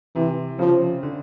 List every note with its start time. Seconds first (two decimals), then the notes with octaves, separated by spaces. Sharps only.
0.15 C3 E3
0.59 C#3 F3
1.03 D3